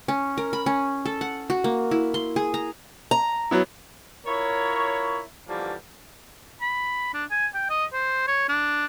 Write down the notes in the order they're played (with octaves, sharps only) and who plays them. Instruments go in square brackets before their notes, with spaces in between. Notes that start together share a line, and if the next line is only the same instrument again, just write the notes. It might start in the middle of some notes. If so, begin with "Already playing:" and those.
[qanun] C#4
A#4
B5
C#4
A4
F#5
F#4
A#3
E4
C6
G#4
A#5
[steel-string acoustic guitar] A#5
[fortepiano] F#3 B3 E4
[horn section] E4 F4 A#4 C#5
D3 E3 F3 G3 A#3 C#4
[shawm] B5
D4
G#5
G5
D#5
C5
C#5
D4